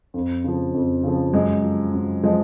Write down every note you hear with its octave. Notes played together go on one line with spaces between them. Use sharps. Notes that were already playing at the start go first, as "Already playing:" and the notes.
F2
C#3 F3
F2
C#3 F3
F#2 G#3
F3
F#2
F3 G#3